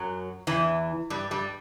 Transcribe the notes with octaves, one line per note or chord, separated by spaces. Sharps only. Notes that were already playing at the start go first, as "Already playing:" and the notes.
Already playing: F#2 F#3
E2 E3
G2 G3
G2 G3